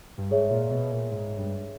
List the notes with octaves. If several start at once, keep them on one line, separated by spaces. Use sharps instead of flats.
G2
G#2 G#4 C#5 E5
A#2
B2
A#2
G#2
G2